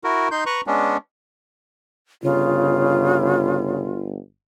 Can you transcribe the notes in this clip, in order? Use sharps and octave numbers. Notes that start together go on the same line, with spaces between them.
E4 F#4 A#4
D#4 C6 G6
B4 A#5 C#6 F#6
G#3 B3 C#4 D4
G1 C#3 F4